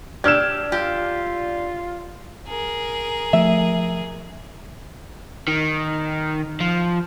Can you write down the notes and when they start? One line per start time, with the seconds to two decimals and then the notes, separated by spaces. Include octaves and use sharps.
0.24 D4 G4 E6 F6 G#6 E7
0.72 F4 G4
2.46 G#4 A#4
3.33 F3 A3 E5
5.48 D#3
6.60 F3